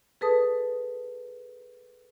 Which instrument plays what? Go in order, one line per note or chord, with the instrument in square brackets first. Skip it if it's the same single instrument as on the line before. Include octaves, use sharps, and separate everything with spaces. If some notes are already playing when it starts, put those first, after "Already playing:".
[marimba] G#4 A4 B4 A5 D#6